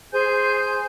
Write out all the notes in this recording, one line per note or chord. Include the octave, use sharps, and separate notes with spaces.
G#4 C5 G#5 G6